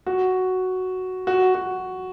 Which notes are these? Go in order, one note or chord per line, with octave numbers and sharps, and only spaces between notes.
F#4
F#4
F#4